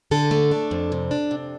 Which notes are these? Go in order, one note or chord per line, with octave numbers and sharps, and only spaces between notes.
D3 A4
A3
D4
F2
C3
D4
C3